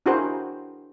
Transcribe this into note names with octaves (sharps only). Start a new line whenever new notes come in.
D4 E4 F#4 G#4 A#4 C5